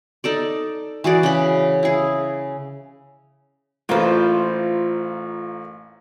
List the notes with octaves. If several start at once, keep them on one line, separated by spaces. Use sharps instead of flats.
D#4 A4 D5
E3 F#4 G#4 D5
C#3 B5
E4 G#4
A1 A#3 F4 B4 C5